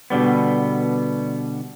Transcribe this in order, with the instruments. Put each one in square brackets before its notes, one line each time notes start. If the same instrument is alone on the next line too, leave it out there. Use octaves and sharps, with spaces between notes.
[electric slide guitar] B2 D3 G3 B3